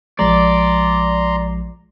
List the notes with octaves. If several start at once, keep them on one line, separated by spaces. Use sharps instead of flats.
A#1 F3 G#3 D5 A#5 C6